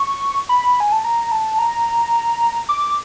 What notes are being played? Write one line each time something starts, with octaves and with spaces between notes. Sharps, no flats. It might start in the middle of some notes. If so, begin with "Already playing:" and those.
Already playing: C#6
B5
G#5
A5
A#5
A5
A#5
D6